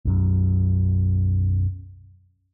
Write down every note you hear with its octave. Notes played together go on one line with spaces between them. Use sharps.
B1 F#2